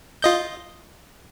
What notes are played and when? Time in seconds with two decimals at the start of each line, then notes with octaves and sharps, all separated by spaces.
0.22 F4 D#5 G6